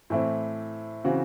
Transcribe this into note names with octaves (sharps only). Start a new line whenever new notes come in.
A2 E3 A3 C4 E4
C#3 E3 C4 F#4